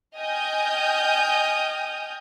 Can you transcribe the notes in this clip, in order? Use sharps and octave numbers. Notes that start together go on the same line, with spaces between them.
D#5 G5 G#5 D#6 F6 G6